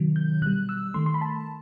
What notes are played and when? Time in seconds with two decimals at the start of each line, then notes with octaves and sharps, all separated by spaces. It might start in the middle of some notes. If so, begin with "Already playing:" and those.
Already playing: C3 D#3 F#3
0.16 G6
0.42 B2 G3 F#6
0.69 E6
0.94 D#3 A3 C6
1.06 C6
1.14 B5
1.21 A5